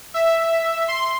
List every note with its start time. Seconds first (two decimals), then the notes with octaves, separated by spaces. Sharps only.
0.14 E5
0.88 C6